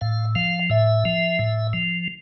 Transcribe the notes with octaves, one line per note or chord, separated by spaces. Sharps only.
A2 F5
F3 F5
A2 E5
F3
A2
F3